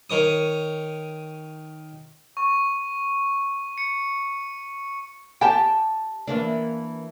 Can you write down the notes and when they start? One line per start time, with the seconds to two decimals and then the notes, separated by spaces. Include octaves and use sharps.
0.10 D#3 C#5 D#6
2.37 C#6
3.78 C#7
5.41 G4 G5 A5
6.27 E3 A#3 D4